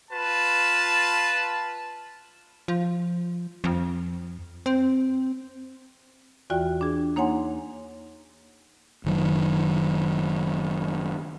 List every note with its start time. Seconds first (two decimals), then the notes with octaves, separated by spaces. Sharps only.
0.10 F4 B4 A5
2.68 F3
3.64 F2
4.66 C4
6.50 E2 E3 F4 F#4 D5 G5
6.81 D4 G#4
7.16 A#3 D#4 C#5 F#5 G#5 C6
9.04 F#1 D#3 F#3